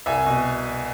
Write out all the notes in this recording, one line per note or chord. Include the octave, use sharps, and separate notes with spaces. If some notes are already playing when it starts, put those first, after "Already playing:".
C2 E5 G#5
B2